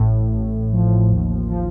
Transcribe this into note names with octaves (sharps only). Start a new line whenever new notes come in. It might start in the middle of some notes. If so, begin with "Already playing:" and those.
Already playing: A1 A2
A1
F3
D#2
F3